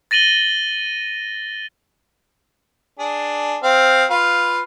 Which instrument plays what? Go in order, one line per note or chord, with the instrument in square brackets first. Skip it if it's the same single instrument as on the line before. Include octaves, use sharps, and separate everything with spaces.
[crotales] A6 A#6 D#7 F#7 G7
[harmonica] D4 G#4
C4 F5
F4 B4 F5